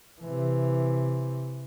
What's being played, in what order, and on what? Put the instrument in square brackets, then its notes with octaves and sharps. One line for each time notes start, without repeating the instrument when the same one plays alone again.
[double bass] C3 E3